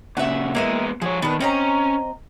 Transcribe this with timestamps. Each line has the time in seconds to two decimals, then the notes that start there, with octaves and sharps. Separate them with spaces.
0.17 A#2 C#3 E5 F#5
0.55 G#3 A#3 B3 E4 D#5
1.02 F3 G#4 C#5
1.22 D#3 B3 D4
1.41 C4 C#4 D#5 A#5